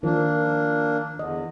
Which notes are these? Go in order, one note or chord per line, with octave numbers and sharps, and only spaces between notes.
D#3 F3 A#3 D4
E2 D3 D#5